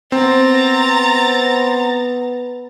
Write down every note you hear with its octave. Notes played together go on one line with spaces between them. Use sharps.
B3 C4 A#5 A6